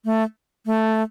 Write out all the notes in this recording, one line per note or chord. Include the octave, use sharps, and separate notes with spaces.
A3
A3